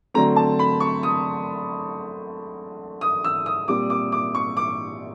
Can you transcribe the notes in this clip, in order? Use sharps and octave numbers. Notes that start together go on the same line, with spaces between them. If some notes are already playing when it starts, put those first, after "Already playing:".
D3 F#3 A3 C4 A#5
A5
B5
C#6
D#6
D#6
E6
D#6
A#2 G3 C4 D6
D6
D6
C#6
D6